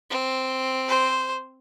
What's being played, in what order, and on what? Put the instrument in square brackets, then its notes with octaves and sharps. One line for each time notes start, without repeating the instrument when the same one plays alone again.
[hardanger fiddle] C4
[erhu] C5